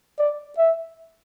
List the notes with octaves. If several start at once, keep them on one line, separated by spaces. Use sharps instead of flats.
D5
E5